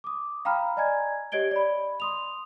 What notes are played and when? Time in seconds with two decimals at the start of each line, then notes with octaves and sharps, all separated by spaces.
0.04 D6 D#6
0.45 F5 G5 A#5 B5 F6
0.77 D5 D#5 G#5 A#5 G#6
1.32 G4 C#5 D#5 G#6 D7 G7
1.51 D5 B5
2.00 C6 D#6 F7